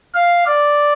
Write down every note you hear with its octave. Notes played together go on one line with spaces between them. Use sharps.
F5
D5